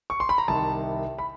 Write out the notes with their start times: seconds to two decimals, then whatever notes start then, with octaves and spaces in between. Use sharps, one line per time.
0.10 C#6
0.20 C6
0.29 B5
0.38 A#5
0.48 C2 C3 D#3 A5
1.18 B5